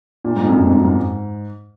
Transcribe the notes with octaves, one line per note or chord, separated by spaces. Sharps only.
A#2
G#2
F2
F#2
F#2
G#2
F#2
G#2